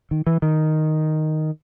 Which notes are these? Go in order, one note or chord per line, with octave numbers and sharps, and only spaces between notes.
D#3
E3
D#3